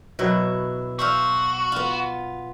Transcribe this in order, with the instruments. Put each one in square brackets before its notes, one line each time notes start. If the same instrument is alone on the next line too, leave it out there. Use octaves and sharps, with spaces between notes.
[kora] B2 F#3 [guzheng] E4
[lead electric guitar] F#4 [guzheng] C5 E5 F5
[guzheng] B3 F4